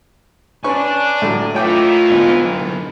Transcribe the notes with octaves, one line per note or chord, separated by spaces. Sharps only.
C#4 D4 B4 G#5 C#6
A2 D3 F#3
D#3 E3 A3 F4 C#5 G5 D6
D2 G#2 B3
F#2 D3